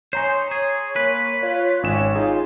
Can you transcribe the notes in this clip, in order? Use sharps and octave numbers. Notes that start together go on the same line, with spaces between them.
D#4 C5 C#5 G#5 A#5 C6
G#4
A#3 B4
F4 C#5
G#1 C#4 E7
D#4 F4 G#4